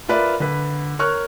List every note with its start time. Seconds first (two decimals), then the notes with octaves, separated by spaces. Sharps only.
0.08 F4 A#4 B4 D5 E5
0.40 D3 B4
0.99 A#4 C#5 C#6 F6 F#6